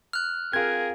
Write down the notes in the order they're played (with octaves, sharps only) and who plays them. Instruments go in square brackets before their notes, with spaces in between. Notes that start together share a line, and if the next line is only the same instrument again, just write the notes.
[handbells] F6 F#6
[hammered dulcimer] C4 F4 [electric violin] G#4 A#4 [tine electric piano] G#6